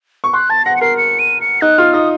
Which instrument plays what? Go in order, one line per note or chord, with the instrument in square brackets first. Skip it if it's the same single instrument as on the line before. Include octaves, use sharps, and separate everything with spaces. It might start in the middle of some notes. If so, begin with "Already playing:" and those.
[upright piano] C#6
[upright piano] C6 [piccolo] F#6
[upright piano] A5 [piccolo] A6
[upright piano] F#5 [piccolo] A#6
[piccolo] C#7
[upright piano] A#4 [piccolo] C7
[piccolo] C#7
D#7
C#7
[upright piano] D#4 [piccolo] F#6
[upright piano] F4 [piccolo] F6
[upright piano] D#4 [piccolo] D#6